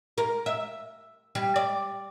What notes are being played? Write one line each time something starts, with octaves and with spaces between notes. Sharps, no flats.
A#4
E5
G3
D5